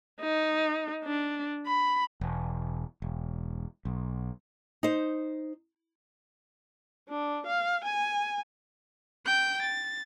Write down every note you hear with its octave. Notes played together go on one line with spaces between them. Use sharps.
D#4
D4
B5
E1
E1
B1
D#4 C5
D4
F5
G#5
G5 G6
A6